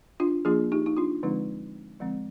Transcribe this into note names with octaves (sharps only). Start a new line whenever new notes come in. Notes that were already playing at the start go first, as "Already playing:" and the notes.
D4 F4
F3 A#3 D4 F4 G#4
D#4 G4
D#4
D4 F4
D3 F3 G#3 C4 D#4
D3 F3 G#3 C4